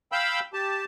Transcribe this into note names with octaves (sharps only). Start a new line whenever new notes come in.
F5 G5 B5 E6 G6
G4 A5